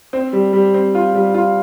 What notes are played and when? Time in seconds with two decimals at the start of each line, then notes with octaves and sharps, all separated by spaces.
0.13 C4
0.33 G3
0.53 G3
0.74 C4
0.95 F4
1.15 G3
1.34 F4